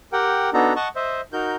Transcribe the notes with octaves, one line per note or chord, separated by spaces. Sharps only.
G4 A#4 F#5 G5
B3 D4 D#4 F#4 A4 A#5
D#5 F#5 A5 C#6
C5 D#5 E5
D#4 F#4 A#4 G6